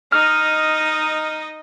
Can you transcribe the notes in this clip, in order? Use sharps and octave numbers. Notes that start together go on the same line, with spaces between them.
D#4 D#5 F6